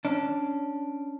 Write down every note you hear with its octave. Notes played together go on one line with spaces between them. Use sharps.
C#4 D4